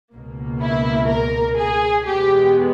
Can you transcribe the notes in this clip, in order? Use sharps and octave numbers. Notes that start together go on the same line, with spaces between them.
C#2 B2 A#3
E4
A#4
G#4
E2 B2 G#3 B3 G4